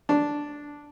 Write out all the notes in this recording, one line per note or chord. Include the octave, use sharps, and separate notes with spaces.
D4